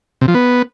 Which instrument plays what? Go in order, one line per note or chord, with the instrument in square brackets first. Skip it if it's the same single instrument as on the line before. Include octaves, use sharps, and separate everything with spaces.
[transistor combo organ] C3
F3
B3